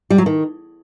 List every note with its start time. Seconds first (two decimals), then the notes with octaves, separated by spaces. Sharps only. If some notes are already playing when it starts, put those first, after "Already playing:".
0.10 G3
0.18 F#3
0.26 D#3